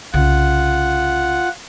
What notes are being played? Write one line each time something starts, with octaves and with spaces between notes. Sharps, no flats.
C2 C#3 F4 F#5